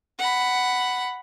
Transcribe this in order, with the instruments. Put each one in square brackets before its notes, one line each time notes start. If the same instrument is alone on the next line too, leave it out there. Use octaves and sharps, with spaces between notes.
[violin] F#5 B5